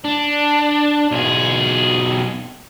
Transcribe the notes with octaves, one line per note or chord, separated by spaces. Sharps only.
D4
B1 G#4